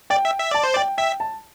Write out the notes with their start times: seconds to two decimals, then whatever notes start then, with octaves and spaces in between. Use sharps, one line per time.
0.10 D5 G5
0.25 E5
0.39 E5
0.51 D5 A5
0.63 C5
0.74 D5 G5
0.98 E5 G5
1.20 A5